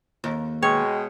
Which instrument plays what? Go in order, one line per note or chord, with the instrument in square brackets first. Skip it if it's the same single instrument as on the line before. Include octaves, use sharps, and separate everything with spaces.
[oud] D#2
[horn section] B2 G#3 [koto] C#5 [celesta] G5 C#6